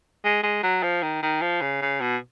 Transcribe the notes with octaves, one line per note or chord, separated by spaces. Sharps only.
G#3
G#3
F#3
F3
D#3
D#3
F3
C#3
C#3
B2